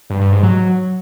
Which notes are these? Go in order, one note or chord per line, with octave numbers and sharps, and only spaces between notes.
G2
G2
G#2
F#3